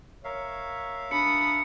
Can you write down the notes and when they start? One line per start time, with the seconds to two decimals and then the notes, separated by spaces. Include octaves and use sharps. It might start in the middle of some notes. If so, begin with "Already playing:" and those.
0.24 A#4 C#5 E5 F5
1.11 D4 B5 D#6 C#7